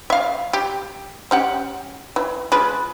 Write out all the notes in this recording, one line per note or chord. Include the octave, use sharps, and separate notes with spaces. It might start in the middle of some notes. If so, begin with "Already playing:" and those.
E5 F5
G4
C#4 G4 F#5
E3
G#3 F4 B4